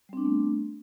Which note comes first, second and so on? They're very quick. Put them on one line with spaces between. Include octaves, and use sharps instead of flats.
G3 C4 D4 B3 A3